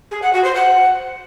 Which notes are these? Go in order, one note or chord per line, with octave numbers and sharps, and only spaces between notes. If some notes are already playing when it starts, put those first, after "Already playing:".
G#4
F#5
F#4
C5
F#5